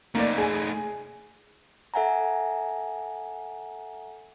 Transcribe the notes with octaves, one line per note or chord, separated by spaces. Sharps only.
A3 A#3 D#4 D5
G#4 G#5
A4 E5 F#5 G#5 A#5